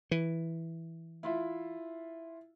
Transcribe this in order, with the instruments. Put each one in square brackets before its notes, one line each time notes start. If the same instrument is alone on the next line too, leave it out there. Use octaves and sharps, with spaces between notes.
[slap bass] E3
[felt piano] E4 F4 E5